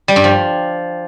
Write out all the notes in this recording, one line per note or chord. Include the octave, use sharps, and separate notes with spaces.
G3
G2
F3